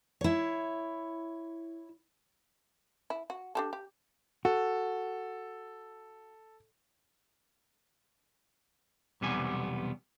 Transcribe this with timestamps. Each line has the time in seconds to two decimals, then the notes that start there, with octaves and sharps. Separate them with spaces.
0.21 E4 C#5
3.10 E4
3.30 F#4
3.55 D4 G4 A4
3.73 G4
4.45 F#4 A4
9.21 B1 E2 C3 G3 B3 G#5